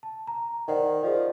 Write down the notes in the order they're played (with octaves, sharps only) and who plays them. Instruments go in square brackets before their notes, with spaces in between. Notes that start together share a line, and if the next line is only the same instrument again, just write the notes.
[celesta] A5
A#5
[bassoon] D#3 [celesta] C5 D5 F#5
[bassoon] F3 [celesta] G#4 D5